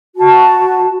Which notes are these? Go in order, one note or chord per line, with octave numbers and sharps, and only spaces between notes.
F#4 A5